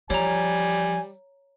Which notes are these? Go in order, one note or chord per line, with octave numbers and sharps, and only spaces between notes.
E3 F3 G3 C#5 G#5 A#5